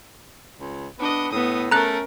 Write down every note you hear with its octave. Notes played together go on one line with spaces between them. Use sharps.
C#2
B3 D4 D#5
A2 B3 D#6
A3 C#4 A#4 A#5 F#6